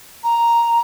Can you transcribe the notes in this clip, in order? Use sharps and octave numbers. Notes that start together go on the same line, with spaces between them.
A#5